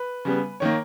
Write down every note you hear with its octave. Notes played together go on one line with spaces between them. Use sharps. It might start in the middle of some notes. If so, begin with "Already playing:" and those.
Already playing: B4
C#3 G3 B3
D#3 A#3 C#5